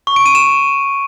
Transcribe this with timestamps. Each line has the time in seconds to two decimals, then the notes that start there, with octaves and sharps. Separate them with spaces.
0.07 C#6
0.16 D7
0.26 D#7
0.35 E7